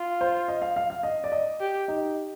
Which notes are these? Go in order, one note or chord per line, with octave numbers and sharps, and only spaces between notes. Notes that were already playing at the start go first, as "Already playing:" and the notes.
Already playing: F4
C5
D#5
F5
F5
F5
D#5
D5
D#5
G4
D#4